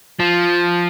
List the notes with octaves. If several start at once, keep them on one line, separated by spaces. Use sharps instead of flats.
F3